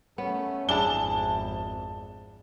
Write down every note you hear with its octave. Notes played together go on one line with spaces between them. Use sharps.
A3 B3 C#4
G#1 F2 D4 E4 G#4 A5 G7